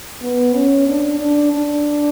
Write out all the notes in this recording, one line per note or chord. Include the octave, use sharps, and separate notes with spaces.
B3
C#4
D4
D4
D4